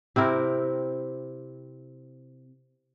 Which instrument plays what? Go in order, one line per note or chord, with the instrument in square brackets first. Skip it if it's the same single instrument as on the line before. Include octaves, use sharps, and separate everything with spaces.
[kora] C3 C4 E4 A#4